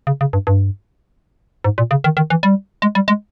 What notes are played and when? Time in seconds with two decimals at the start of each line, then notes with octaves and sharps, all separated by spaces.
0.07 C#3
0.21 C#3
0.33 G2
0.47 G2
1.64 G#2
1.78 A#2
1.91 C#3
2.04 D#3
2.17 D#3
2.30 E3
2.43 G3
2.82 G#3
2.95 G3
3.08 G#3